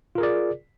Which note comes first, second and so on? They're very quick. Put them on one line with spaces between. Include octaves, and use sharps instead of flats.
F4 A#4 G#4 D5